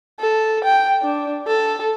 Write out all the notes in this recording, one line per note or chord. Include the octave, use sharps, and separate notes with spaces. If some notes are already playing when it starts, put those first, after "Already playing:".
A4
G5
D4
A4